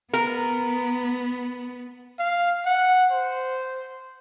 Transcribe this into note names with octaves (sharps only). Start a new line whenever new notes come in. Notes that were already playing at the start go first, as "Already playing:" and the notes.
B3 A#4
F5
F#5
C5